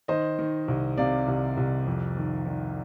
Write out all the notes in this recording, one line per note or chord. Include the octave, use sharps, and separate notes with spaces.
D#3 C5 D#5
D#3
C2
C3 D5 F5
C2
C2
F2
D#3
D#3